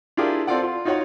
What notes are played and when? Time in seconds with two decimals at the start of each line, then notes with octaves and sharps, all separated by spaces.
0.17 D4 E4 F4 G4 G#4 A#4
0.47 C4 F4 A4 D5 F#5
0.63 F4
0.85 D#4 F4 F#4 C#5 F5 F#5